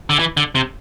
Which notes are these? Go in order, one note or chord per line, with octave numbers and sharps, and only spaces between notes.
D3
E3
D3
C3